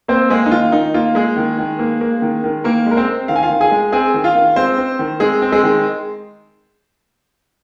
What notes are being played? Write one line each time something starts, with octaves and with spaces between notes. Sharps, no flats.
A#3 C4 C5
G#3 A#3 G#4
D#4
D#3 F4
D#3 D#4
A#3 F4
G#3 A#3 G#4
D#3
D#3
A#3
A#3
D#3
D#3
D#3 A#3 A#4
G#3 A#4
C4 C5
C4
D#3 F5
G#5
F4 F5
D#3
G#4 G#5
G#3
C4 G#4 G#5
D#3
F4 F5
D#3
G#3 C4 C5
C4
D#3
G#3 C4 G#4
C4
G#3 G#4
D#3